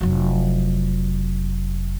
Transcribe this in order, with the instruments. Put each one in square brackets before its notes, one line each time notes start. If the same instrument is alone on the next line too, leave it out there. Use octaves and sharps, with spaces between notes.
[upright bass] F1 F#3